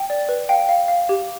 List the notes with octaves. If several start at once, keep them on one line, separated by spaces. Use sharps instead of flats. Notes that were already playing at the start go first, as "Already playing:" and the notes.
Already playing: G5
D5
B4
F5 G5
F5
F5
G4